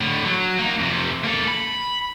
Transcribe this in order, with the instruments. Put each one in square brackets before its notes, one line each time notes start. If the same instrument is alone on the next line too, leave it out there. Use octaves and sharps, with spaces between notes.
[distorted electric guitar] A2 D3
F#3
A#3 D#4
F2 C3
A#3 A4
B5